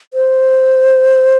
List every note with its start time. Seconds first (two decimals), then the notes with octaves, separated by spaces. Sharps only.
0.14 C5